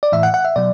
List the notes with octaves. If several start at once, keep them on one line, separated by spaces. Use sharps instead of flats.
D5
A2 E3 E5
F#5
F#5
E5
B2 F#3 D5